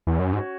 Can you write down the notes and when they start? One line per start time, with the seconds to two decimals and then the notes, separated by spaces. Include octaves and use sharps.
0.07 E2
0.19 F#2
0.33 G#2 C#4 F#4 C#5